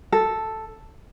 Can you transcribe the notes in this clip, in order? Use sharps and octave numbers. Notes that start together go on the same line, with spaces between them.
A4